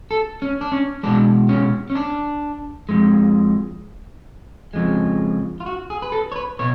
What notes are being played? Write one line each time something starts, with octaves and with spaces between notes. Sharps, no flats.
A4
C#4
D4
C#4
B2 G#3 D4
C#4
C#4
D4
F2 C#3 G#3
F2 C#3 F3 G#3
F4
F#4
G#4
B4
A4
C#5
B4
B2 C#5